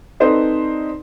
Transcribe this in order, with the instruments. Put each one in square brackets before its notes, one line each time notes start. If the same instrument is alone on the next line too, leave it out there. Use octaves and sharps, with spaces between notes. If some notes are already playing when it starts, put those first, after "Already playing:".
[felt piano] C4 D#4 A4 B4 C5 D5